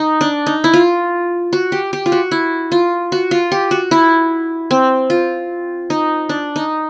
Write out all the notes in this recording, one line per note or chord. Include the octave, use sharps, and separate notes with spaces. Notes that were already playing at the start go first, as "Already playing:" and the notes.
Already playing: D#4
D4
D#4
E4
F4
F#4
G4
G4
F4
F#4
E4
F4
F#4
F4
G4
F#4
E4
C4
F4
D#4
D4
D#4